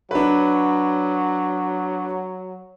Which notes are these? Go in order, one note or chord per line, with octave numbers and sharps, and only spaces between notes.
F#3 D4 B4